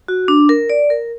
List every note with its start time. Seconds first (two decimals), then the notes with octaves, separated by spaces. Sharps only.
0.08 F#4
0.28 D4
0.49 A#4
0.70 D5
0.90 A#4